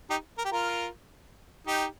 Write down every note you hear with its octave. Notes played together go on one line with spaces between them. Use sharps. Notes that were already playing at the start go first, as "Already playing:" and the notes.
D#4 G4
A#4
G4
F4 A#4
D#4 G4